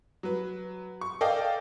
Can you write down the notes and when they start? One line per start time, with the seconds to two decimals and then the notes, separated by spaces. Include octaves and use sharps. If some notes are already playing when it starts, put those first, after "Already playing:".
0.23 F#3 B4
1.01 C#6
1.21 A4 D5 D#5 F5 G5